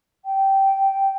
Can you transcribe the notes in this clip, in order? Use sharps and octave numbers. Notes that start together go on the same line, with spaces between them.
G5